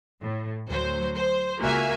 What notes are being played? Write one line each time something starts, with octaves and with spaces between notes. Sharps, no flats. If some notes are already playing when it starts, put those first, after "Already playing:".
A2
D2 F#3 C5
C5
C#2 A#3 F#4 E5 G#5